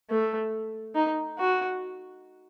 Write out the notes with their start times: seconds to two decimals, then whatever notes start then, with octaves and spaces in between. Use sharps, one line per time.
0.10 A3
0.95 D#4
1.38 F#4